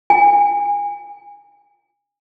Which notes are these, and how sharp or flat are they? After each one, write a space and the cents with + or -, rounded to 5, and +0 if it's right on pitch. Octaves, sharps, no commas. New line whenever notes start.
G#5 -30